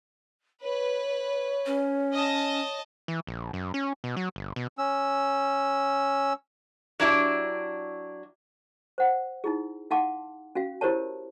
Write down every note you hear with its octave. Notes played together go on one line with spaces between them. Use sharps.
B4 C#5
C#4
D#5 A5
E3
A#1
F#2
C#4
B2
F#3
G1
B2
C#4 E6
F#3 D4 E4 G4
C5 F#5
D#4 E4 G#4
D#4 F5 F#5 A5 C6 D6
C#4 F#4 F5
E4 G4 A#4 C5 C#5 A5